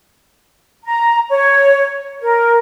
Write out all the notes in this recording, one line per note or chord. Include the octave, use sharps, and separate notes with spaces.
A#5
C#5
A#4